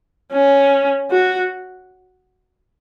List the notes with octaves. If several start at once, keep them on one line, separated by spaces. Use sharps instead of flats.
C#4
F#4